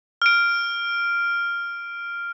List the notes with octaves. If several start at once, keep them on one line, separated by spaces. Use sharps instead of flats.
F6 D7